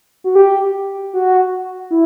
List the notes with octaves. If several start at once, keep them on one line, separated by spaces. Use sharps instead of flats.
F#4
G4
F#4
E4